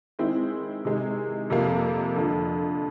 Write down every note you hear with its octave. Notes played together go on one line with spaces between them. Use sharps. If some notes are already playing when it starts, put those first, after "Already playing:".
D#3 G#3 C4 E4
C3 D#3 G#3
F2 C3 F3 A#3
F2 D3 F3